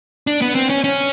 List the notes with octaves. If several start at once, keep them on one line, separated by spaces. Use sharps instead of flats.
D4
B3
C4
C#4
C#4